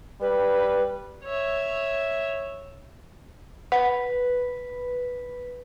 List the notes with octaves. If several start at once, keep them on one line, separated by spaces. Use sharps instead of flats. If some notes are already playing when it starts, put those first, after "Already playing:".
G3 B4
C#5 E5
B4 F#5